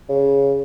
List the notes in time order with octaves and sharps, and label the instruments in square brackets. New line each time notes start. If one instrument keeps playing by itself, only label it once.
[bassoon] C#3